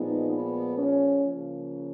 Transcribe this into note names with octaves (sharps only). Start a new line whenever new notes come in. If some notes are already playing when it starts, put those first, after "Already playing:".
Already playing: A#2 F3 G#3 B3 D#4
B3
C#4
C#3 F3 A#3